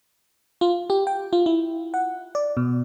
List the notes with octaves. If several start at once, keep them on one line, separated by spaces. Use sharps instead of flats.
F4
G4
G5
F4
E4
F#5
D5
B2